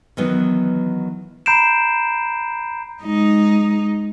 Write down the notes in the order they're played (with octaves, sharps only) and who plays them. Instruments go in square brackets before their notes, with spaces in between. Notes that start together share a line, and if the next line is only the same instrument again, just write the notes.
[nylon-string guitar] D#3 E3 F#3 B3
[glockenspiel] A#5 B5 G6 C7 D7 E7
[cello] G#3 D#4